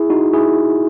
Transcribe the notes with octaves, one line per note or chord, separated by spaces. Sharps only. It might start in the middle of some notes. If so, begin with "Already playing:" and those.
Already playing: E4 G#4
D#4 F#4
E4 G#4